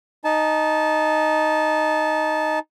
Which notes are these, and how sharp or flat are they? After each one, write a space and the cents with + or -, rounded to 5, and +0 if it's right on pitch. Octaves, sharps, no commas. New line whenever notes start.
D#4 +0 A5 -20